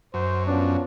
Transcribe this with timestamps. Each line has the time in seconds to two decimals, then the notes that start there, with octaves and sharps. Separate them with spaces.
0.14 F#2 C5
0.46 F3 B3 C#4 D4